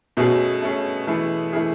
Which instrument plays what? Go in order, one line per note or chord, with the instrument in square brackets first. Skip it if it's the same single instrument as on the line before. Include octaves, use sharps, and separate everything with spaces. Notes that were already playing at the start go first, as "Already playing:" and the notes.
[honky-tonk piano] B2 [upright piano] A3 C#4 G#4
[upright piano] A3 C#4 G#4
E3 A3 E4 G#4
E3 A3 E4 G#4